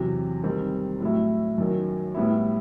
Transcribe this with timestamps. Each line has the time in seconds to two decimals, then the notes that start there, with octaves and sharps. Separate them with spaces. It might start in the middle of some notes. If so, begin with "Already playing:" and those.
Already playing: E2 C3 F#3
0.43 D#3 G3 C4
1.00 A2 F#3 A3 E4
1.58 F#2 D#3 F#3
2.15 A2 G3 B3 E4